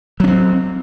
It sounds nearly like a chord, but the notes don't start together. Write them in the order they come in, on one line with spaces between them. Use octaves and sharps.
F#3 C#4 C4